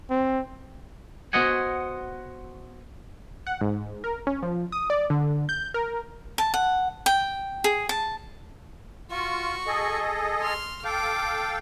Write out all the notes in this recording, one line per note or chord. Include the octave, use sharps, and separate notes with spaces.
C4
B3 F#4 C5 D#5 F#5 G#5
F#5
G#2
A#4
C#4
F3
D#6
D5
D3
G6
A#4
A5
F#5
G5
G#4
A5
F4 F#4 C#6
G#4 A4 D#5
C6 F6
A4 F5 G5 D6